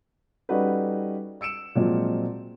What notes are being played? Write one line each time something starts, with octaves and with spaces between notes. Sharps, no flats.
G3 C#4 D#4 F#4 A4 B4
E6 C#7 D7 E7
A#2 F3 F#3 G#3 C4